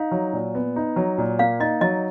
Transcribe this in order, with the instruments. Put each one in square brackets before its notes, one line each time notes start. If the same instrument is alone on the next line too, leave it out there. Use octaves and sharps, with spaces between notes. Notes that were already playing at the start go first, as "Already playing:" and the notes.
Already playing: [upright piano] D#4 [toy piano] F5
[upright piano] F#3
A#2
B3
D#4
F#3
A#2
[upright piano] A#3 [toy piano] F5
[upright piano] D#4 [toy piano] D#5
[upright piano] F#3 [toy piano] D#5